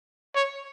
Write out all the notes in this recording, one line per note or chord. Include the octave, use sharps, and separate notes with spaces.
C#5